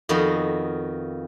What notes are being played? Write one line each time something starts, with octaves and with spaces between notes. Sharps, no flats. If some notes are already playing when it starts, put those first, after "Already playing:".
F2 D#3 B3 F#4 D#5 F5